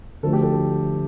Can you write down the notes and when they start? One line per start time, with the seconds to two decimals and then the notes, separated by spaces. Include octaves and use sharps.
0.23 D2 D3 F3 A3 A4
0.33 G4
0.43 A4